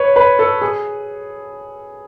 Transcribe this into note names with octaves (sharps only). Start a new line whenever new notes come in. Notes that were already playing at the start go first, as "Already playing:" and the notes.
Already playing: B4 C#5
B4
A4
G#4